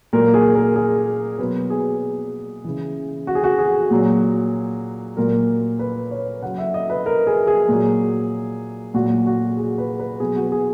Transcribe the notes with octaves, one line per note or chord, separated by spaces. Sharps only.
A#2 F#3 A#4
G#4
A#4
G#4
B2 F#3 B4
G#4
C#3 E3
F#4
G#4
F#4
G#4
A#2 F#3
A#2 F#3 A#4
B4
C#5
C#3 F#3 F#5
E5
D#5
B4
A#4
G#4
G#4
A#2 F#3
A#2 F#3 F#4
F#4
G#4
B4
B4
B2 F#3 G#4
F#4
G#4